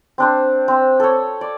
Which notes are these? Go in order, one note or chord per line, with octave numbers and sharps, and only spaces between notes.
C4 D4 C5
C4
A4 C#5
D5